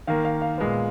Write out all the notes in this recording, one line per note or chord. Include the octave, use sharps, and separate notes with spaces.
D#3 A#3 F5
F5
F5
A#2 G#3 B3